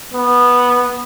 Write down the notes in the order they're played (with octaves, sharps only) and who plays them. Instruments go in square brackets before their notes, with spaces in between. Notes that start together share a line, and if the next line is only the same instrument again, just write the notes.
[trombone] B3